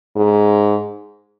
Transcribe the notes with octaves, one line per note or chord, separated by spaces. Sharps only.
G#2